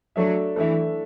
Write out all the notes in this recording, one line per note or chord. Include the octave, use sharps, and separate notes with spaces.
F#3 A3 D4 A4 E5
E3 A3 D4 A4 E5